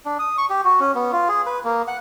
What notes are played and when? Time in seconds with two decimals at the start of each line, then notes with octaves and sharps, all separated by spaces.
0.06 D4
0.19 D#6
0.38 C#6
0.50 G4
0.65 F#4
0.80 C#4
0.95 B3
1.12 F4
1.28 G#4
1.46 B4
1.65 A#3
1.88 F#5